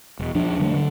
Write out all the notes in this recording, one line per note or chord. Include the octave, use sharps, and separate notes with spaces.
E1
D#1 F3 D4
D3 F#3 G#3 A3
D3